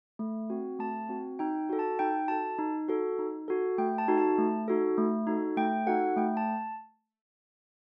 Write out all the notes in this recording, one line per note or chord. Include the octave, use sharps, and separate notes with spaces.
A3
C4 F#4
A3 A5
C4 F#4
D#4 G5
F#4 A4
A5
D#4 G5
F#4 A4 A5
D#4
F#4 A4
D#4
F#4 A4
A3 G5
A5
D#4 F#4 A4
A5
A3
D#4 F#4 A4
A3
D#4 F#4 A4
A3 G5
D#4 F#4 A4 F#5
A3 G5
A5